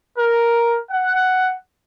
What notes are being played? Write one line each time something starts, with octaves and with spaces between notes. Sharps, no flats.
A#4
F#5